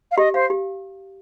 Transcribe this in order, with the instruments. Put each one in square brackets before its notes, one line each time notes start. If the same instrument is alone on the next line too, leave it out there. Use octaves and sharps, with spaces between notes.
[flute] F5
[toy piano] G4 [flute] D#5
[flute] C5 [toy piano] F5
[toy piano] G4